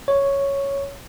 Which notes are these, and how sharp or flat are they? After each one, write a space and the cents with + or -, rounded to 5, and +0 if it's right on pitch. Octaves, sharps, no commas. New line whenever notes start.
C#5 +0